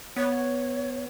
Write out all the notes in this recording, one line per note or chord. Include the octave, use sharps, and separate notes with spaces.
B3 C#5